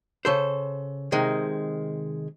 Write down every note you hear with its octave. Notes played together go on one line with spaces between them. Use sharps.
C#3 A4 C5
C3 D#3 G#3